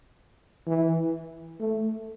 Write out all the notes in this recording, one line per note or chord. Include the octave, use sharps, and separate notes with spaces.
E3
A3